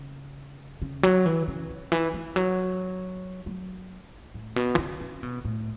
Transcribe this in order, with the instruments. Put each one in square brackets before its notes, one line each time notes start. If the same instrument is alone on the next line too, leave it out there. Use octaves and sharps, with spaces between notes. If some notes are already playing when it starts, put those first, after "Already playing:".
Already playing: [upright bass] C#3
C#3
F#3
E3
C#3
C#3
E3
E3
F#3
F#3
A2
B2
E3
C#3
C#3
B2
A2